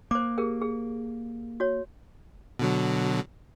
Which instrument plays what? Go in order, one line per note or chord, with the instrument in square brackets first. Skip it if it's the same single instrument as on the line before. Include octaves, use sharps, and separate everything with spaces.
[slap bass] A#3 [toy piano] C5 D6
[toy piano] G4 G#4 A#4
G#4
F#4 C#5
[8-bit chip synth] B2 D3 F#3